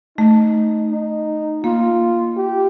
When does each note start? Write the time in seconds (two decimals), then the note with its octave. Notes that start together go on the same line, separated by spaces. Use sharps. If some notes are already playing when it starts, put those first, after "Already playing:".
0.18 A3 D#4
0.91 D#4
1.63 A#3 F4
2.37 G4